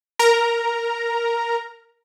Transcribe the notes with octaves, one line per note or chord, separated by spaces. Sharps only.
A#4 A#5